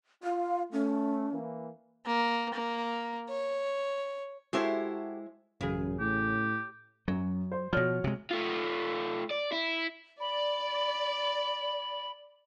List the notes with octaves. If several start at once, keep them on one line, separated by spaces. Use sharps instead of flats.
F4 F5
A3 C#4
E3 A#3
A#3
A#3
C#5
G#3 E4 F#4 G4 A4 C5
A1 F#2 C#3 G#4
A2 G4
F#2 F#3
C5 C6
B2 F3 F#4 C#5 F6
C3 G#3
A3 F4
D5
E4
D5 B5